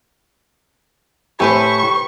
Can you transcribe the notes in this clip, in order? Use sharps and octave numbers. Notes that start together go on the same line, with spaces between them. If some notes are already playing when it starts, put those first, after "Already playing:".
A2 G4 B4 C5 E5 G#5 C#6